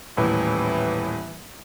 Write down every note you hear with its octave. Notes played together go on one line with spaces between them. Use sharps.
D#1 A2 E3